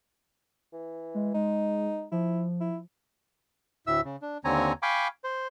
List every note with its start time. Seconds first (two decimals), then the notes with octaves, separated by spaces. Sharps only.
0.73 E3
1.14 G#3
1.34 G#3 D#4
2.12 F3 E4
2.60 E4
3.87 D2 A2 E5 E6
4.04 C#3
4.22 D4
4.45 D#2 D3 C4 C#5 G#5 A#5
4.83 F5 G5 G#5 B5 C#6 D6
5.24 C5